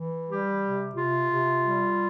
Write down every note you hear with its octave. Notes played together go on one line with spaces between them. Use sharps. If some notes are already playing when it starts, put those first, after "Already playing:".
Already playing: E3
G3 G4
C3
C3 F4
C3
G3